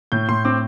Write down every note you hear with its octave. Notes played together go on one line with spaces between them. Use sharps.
A2 G6
A2 C6
C4 D6